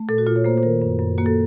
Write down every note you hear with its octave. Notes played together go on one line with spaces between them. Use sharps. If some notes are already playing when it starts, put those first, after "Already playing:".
Already playing: A3
A#2 A4
F#4
A#2 F4
C#5
A#3 C5
C5
D#3 A#4
F#2
F#2
A#3 F#4
A4